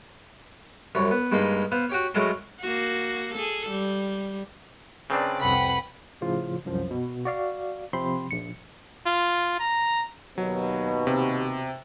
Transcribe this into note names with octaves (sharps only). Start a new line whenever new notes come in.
C2 F#2 C#5
B3
G2 G#3 A#3 D#4 B5 C6
B3 C5 F5
F#4 G4 C#5
A2 F#3 G#3 A#4 A5 C6
A#3 F#4
G#4 A4
G3
C#3 C4 D4 B4 D5
C2 F2 B4 F#5 G5 B5
A2 C#3 F3 F4
C2 F#2 F3
B2
F#4 D5 F5
C3 F3 C4 B5 C6
A#1 C#7
F4
A#5
D#2 B2 F#3
C3